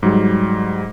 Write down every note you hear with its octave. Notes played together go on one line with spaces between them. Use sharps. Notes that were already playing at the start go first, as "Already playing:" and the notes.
G#2 F#3 G3